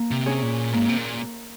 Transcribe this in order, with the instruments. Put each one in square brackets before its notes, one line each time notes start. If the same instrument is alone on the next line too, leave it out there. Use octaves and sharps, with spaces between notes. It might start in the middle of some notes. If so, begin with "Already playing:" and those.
Already playing: [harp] A#3
[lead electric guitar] C3
[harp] C#4 G#4 C#5
[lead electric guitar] A#2
[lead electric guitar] G#2 [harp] A#3
[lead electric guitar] C3
A#2